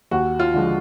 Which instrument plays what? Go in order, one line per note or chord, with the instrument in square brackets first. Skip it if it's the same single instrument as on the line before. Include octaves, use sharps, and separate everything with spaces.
[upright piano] D#2 F#4
F4
D3 F3 G#3